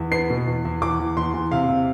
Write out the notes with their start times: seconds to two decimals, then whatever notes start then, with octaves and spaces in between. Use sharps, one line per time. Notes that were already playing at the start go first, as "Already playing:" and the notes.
Already playing: E2
0.11 B3 C7
0.30 B2
0.47 E2
0.65 E2
0.82 E2 D6
1.00 E2
1.17 E2 C6
1.34 E2
1.51 C3 F5
1.69 C3